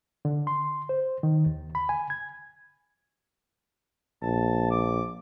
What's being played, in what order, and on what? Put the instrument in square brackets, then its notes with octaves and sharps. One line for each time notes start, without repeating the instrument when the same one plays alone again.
[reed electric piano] D3
C6
C5
D#3
D#2
B5
G#5
G#6
[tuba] A#1 [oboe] A5
[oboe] D6